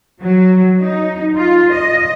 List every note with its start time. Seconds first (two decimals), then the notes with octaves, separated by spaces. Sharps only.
0.21 F#3
0.81 D#4
1.37 F4
1.73 D#5